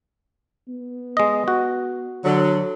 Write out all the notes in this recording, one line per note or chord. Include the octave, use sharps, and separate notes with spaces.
B3
G#3 D#5
F#4
D3 F#3